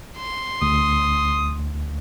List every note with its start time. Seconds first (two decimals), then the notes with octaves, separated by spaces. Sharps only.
0.18 C6
0.62 D2 D#6